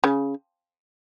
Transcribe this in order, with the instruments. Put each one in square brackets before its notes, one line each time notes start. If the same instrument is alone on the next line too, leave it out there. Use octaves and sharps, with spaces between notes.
[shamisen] C#3